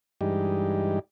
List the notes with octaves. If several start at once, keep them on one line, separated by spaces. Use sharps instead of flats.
G2 E3 G3 G#3 D#4 G4